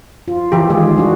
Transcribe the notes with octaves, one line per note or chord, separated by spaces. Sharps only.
F4
E3 G4
D#3 G#3 F4 G#4
G3 D4 F#4